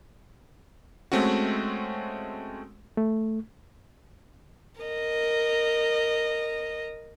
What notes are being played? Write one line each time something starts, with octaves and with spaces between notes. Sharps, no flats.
G#3 A3 C4 C#4 F#4
A3
A#4 D#5